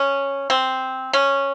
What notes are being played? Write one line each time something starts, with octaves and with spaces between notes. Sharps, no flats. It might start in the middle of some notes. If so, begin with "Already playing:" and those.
Already playing: C#4
C4
C#4